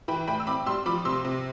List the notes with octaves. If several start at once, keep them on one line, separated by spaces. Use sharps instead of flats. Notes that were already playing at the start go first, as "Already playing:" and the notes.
E3 G5 B5
A2 G5 B5
E6
C4 B5 D6
G3 C6 E6
F3 B5 D6
C3 C6 E6
C3